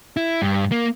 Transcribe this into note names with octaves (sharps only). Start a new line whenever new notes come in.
E4
G2
A#3